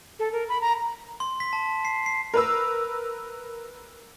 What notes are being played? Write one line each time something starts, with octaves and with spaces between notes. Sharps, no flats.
A4
A#4
B5
A#5
C6
B6
A5
C7
C7
A#4 B4 E6